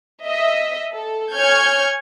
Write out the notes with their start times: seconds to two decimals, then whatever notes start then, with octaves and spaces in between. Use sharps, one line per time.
0.24 D#5 E5
0.93 A4
1.33 C#5 G#5 C#6 F6 G6 G#6